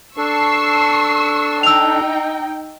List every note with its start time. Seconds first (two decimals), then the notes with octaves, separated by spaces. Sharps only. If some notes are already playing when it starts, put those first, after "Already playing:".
0.17 D4 A4 C#6 E6 C7
1.63 D#4 G5 E6 F7